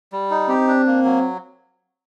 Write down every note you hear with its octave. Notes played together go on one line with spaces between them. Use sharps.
G3
D#4
C4 G4
D4
A#3
F#3